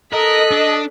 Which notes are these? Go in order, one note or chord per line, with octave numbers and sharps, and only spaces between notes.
A4 A#4 D#5 F#6 B6
D4